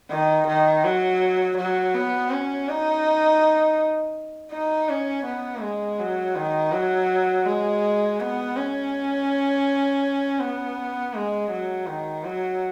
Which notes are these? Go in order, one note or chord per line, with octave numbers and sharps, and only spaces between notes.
D#3
D#3
F#3
F#3
B3
C#4
D#4
D#4
C#4
B3
G#3
F#3
D#3
F#3
G#3
B3
C#4
B3
G#3
F#3
D#3
F#3